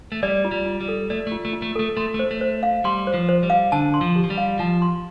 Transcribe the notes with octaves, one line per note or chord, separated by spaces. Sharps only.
A3
G3 D5
F4
G3
F4
G3
A4
A3 D5
A3
F4
A3
F4
A3
A3 A4
A3 C6
A3
C5
A3
C5
F5
G3 C6
C5
F3
C5
G3
F5
D3 A5
C6
F3
G4
F3
G3
F5
F3 A5
C6